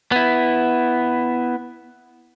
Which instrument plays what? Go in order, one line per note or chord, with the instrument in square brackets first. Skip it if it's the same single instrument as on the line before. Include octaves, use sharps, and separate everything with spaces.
[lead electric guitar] B3 E4